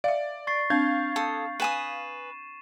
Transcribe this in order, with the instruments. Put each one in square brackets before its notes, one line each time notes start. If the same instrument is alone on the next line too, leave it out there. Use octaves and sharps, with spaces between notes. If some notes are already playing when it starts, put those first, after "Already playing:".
[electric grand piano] D5 [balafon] E5 F5
[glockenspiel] C#6 A6 C7
[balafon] C4 D4 [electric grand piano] F5 G6 G#6
[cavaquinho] A4 D#6
[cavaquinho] B4 G#5 D#6 [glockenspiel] D#7 E7